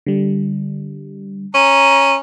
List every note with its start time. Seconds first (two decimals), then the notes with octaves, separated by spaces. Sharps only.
0.06 D3 G3
1.54 C#4 A#5 D#7